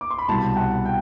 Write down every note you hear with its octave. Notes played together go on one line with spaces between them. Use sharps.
D6
C6
B5
C2 B2 G3 A5
F#5
G5